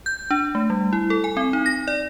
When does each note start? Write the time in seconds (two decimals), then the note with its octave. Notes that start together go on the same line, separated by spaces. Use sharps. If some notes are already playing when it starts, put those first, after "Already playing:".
0.06 G6
0.30 D4
0.55 A3
0.70 G3
0.93 E4
1.10 A4
1.24 G#5
1.37 C4
1.53 D#4
1.66 A#6
1.88 D5